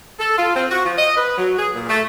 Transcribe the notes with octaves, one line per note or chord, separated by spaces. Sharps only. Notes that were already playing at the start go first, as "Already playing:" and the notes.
A4
F4
C4
F#4
F3
D#5
B4
F#3
G#4
A#2
A3